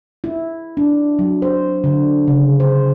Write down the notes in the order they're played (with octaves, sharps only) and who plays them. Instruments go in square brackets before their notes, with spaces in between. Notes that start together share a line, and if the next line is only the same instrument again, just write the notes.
[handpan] E4
D4
F#3
C5
D3
C#3
C5